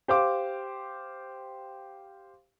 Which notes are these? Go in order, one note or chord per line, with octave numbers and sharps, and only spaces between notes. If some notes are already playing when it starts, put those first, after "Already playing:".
G4 C5 F5 D6